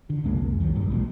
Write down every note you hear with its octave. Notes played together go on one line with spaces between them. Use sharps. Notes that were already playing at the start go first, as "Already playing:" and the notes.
D3
C2 F2 G#3 A#3
C2 D#3 F#3
A1 G2 G3
B1 A#2 F#3 G#3